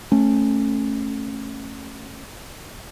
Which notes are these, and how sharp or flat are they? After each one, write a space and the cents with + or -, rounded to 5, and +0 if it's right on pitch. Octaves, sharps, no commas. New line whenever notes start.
A3 +0 C#4 -20